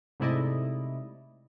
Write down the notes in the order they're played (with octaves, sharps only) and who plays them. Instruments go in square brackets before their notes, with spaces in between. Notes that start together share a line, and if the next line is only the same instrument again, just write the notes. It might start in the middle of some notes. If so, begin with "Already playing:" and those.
[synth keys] G#2 C3 A3 E4 D5 D#5